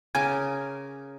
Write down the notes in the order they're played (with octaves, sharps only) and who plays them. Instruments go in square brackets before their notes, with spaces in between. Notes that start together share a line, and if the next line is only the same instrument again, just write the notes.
[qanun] C#3 A#4 D6 [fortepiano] G#5